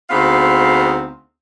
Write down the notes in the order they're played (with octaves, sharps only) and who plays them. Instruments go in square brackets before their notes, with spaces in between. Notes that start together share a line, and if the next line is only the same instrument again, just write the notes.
[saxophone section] D2 B3 C4 D#4 G#4 F5